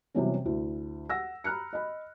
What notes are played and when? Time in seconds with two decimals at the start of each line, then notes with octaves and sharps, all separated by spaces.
0.14 C3 E3 F#3 G3 B3 C#4
0.45 D2 E4
1.10 F#5 E6 A#6
1.44 A#5 B5 F6 F#6 C#7
1.73 D#5 B5